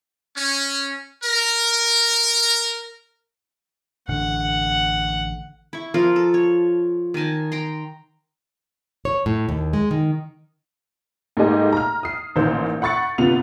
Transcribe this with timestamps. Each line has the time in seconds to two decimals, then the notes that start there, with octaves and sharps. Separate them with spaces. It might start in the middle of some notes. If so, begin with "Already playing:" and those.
0.36 C#4
1.23 A#4
4.09 A1 D3 F#5
5.73 E4 C#6
5.94 F3 F4 A#4
6.16 A4
6.34 C#5
7.14 D#3 D#4 G#5 A5
7.52 G5 A#5 C6
9.05 C#5
9.26 A2
9.49 D#2
9.73 G#3
9.91 D#3
11.37 G#2 A3 A#3 G4 D#5 G#5
11.73 A#5 F6
12.03 D#6 C7
12.36 A1 A#2 D#3 C5 G6
12.82 F#5 B5 C#6 A6 C#7
13.18 G1 C3 B3 F4 F7